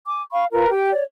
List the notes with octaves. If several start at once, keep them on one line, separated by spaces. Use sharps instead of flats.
G#5 D6
F5 B5 C#6
F4 A#4 B4 A#5
G4 G5
C#5 D5